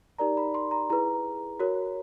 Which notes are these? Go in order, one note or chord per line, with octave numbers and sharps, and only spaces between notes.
D#4 G4 A#4 D5 A#5
B5
C6
A#5
E4 G#4 B4 A#5
F#4 A#4 C#5